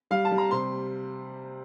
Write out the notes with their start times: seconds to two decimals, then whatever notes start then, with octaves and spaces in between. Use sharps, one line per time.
0.11 G3 F5
0.25 A5
0.31 G3
0.38 A#5
0.51 C3 C6